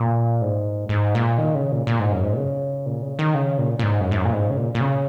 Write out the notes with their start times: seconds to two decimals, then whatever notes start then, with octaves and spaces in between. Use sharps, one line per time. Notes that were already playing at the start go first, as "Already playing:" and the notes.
Already playing: A#2
0.41 G#2
0.89 G#2
1.15 A#2
1.38 D#3
1.55 C#3
1.72 A#2
1.87 A#2
1.99 G#2
2.12 F#2
2.23 G#2
2.33 A#2
2.37 C#3
2.86 A#2
3.02 C#3
3.19 D#3
3.34 C#3
3.58 A#2
3.79 A#2
3.83 G#2
4.00 F#2
4.11 G#2
4.17 F#2
4.25 A#2
4.33 G#2
4.50 C#3
4.57 A#2
4.75 A#2
4.81 C#3